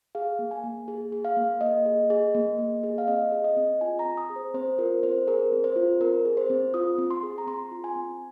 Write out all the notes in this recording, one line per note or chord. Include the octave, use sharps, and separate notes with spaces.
G#4 F5
A#3
G#5
A#3
G#4
G#4
F5
A#3
A#3 D#5
G#4
G#4
A#3
A#3
G#4
F5
C4 D#5
G#4
D#5
C4
F4 G#5
A#5
C4
D#6
G#4
C5
C4 C5
F4 A#4
C4 C5
G#4 A#4
C4
C5
F4
C4 A#4
G#4
C5
C4
F4 D#6
C4
C6
G#4
A#5
C4 C6
F4
G#5
C4